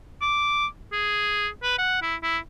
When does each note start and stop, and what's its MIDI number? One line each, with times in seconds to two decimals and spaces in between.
0.21 0.66 86
0.92 1.48 68
1.63 1.76 71
1.78 1.99 78
2.02 2.16 64
2.23 2.38 64